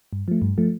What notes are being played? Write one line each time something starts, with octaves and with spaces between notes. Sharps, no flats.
G2
F3 A3
G2
F3 A3